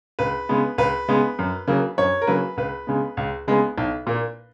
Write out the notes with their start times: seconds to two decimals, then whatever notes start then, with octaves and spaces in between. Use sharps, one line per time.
0.19 C#2 B4
0.49 C#3 G#3 B3
0.78 C#2 B4
1.08 C#3 G#3 B3
1.39 F#2
1.67 C#3 F#3 A#3
1.98 F#2 C#5
2.22 A#4
2.27 C#3 F#3 A#3 B4
2.57 C#2 B4
2.87 C#3 G#3 B3
3.17 C#2
3.48 C#3 G#3 B3
3.78 B1
4.07 A#2 A#3